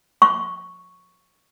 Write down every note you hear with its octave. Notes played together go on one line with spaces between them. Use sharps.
C#6